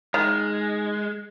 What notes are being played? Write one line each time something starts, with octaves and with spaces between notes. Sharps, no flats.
D#3 G#3